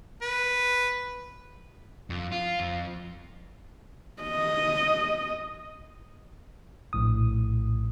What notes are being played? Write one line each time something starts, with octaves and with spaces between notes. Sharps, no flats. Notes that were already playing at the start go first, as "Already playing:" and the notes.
B4
F2
F4
F2
D#5
A#1 A2 D#6